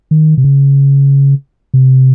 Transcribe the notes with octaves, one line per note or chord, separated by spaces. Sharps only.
D#3
C3
C#3
C3